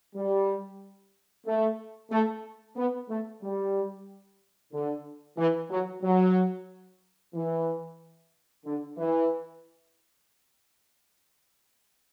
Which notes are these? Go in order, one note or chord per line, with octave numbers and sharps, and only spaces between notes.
G3
A3
A3
B3
A3
G3
D3
E3
F#3
F#3
E3
D3
E3